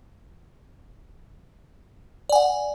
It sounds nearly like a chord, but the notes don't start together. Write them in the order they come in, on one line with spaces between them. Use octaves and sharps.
D5 G#5 F#5